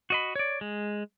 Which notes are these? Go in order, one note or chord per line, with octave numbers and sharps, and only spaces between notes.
F#4 D#5 B5
C#5 D5
G#3